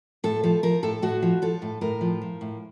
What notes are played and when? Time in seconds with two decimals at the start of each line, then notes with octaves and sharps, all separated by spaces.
0.24 A2 A4
0.43 F3 A4
0.63 F3 A#4
0.83 A2 A4
1.02 A2 F#4
1.22 F3
1.42 F3 A4
1.62 A2
1.81 A2 A#4
2.01 F3
2.22 F3
2.41 A2